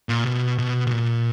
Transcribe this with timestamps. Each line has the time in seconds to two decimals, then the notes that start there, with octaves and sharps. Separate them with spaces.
0.09 A#2
0.26 B2
0.58 B2
0.87 B2
0.91 A#2